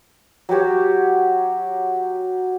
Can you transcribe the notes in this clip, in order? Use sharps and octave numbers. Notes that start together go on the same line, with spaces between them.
F#3 F#4 G4 C#5